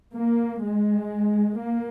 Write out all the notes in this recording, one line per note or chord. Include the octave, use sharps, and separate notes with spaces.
A#3
G#3
A#3